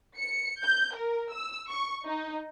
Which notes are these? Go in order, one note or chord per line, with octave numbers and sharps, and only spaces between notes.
C#7
G6
A#4
E6
C#6
D#4